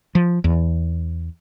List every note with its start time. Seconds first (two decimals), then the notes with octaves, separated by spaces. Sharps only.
0.15 F3
0.44 E2